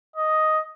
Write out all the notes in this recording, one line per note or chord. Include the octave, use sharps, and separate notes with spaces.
D#5